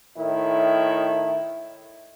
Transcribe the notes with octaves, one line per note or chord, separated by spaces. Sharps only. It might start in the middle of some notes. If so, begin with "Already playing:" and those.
A2 D#3 E4